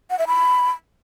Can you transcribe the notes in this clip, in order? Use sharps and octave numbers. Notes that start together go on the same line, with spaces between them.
F#5
E5
B5